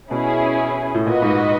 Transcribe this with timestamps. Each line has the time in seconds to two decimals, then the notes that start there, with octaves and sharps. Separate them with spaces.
0.10 B2 C#4 E4 G#4
0.95 A2
1.06 A#2 F#4 B4 D#5
1.22 G#2